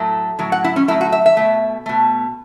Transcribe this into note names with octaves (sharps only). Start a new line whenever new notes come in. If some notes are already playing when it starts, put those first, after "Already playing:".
Already playing: A2 F#3 A3
A2 F#3
F#5
E4
C#4
A2 F#3 A3 E4
F#4
E5
E5
B2 A3
B2 A3